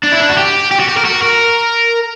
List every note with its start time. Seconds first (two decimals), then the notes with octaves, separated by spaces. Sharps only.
0.04 D4
0.12 E4
0.21 D4
0.29 F#4
0.38 G4
0.71 G4
0.80 F#4
0.89 G4
0.97 A#4
1.05 F#4
1.22 A#4